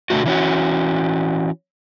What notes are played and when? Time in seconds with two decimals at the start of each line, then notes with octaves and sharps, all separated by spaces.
0.10 B2 D3 D#3 A3 F#4
0.26 E3 C#4 F#4